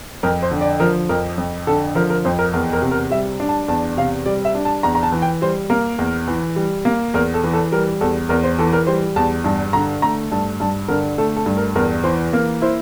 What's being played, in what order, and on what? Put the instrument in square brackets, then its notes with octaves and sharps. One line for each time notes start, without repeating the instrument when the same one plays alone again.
[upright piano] F2 A#4
C5
D3
D5
F3 A#4
F2 A#4
F2
D3 A4
F3 A#4
A#4
F2 C5
A#4
E2 A#4
A#4
C3
A#4
G3 E5
D4
A5
E2 A5
C3 F5
G3 D5
E5
D4
A5
E2 A#5
A#5
A5
E3
G5
G3 C5
A#3 A#4
E2
E3
G3
A#3
E2 A#4
A4
E3
A4
G3 A#4
E2 A4
E2 A#4
C5
E3 A4
A#4
G3 C5
E2 A5
G2 A5
D3 A#5
A3 A#5
G2 A5
G2 A5
D3 A#4
A3 A4
A4
G2
A#4
E2 A#4
E3 C5
A#3 A#4
E4 C5